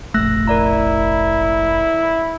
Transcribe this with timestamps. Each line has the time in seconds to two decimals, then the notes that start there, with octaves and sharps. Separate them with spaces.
0.14 F1 A#1 A3 E6 F#6 A#6
0.47 E4 A#4 D5 A#5